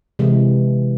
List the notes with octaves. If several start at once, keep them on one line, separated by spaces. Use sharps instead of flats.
C3 E3 G#3